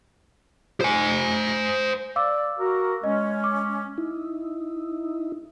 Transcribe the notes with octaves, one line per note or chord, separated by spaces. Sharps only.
C5 G#5
D5 F5 D6 E6
F#4 A#4
G#3 C#4 D#5
D6
D#4 E4